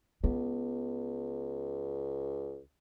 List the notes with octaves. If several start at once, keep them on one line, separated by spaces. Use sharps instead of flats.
C#2 B3